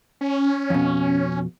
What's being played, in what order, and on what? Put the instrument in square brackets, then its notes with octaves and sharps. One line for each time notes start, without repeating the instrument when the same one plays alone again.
[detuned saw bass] C#4
[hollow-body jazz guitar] F2 B2